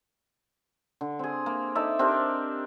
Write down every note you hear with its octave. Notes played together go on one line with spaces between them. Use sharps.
D3
C4 G#4
A#3
D#4 A4 D5 E5
C4 D4 G4 A#4